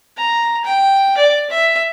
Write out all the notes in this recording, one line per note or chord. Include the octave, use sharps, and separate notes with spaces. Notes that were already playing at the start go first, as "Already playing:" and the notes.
A#5
G5
D5
E5